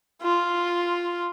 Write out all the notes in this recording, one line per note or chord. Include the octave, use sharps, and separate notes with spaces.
F4